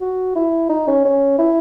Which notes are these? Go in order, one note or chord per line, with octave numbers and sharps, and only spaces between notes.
F#4
E4
D#4
C#4
C#4
E4